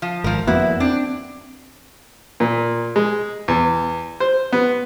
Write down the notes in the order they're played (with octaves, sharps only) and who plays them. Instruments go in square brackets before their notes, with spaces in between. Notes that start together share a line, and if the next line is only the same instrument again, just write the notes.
[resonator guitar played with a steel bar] F3
[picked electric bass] G#1 [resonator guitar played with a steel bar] F3 A#4
[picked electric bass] F2 A#3 B3 [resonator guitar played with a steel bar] E4 F#4
[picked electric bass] C4 [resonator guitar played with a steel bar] D4
[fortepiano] A#2
G#3
E2
C5
B3